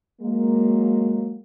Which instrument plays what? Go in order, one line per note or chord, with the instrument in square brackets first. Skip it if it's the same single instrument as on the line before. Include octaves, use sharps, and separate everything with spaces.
[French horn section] F#3 G#3 A#3